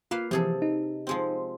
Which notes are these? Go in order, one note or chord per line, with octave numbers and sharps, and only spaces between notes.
A#3 F4 B4 F5
C3 E3 F3 G#4 A4
D#4
F3 G#3 C4